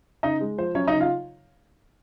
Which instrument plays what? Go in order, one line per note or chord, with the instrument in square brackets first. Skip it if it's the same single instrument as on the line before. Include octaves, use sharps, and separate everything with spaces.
[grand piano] C#3 D#4 D#5
G#3
F3 C5
F#3 C#4 C#5
D#4 D#5
C#3
F4 F5